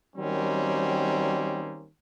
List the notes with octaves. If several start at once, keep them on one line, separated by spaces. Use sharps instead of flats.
D#3 F#3 G3 A#3 C4 C#4